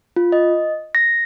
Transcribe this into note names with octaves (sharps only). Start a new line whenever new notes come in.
F4
D#5
A#6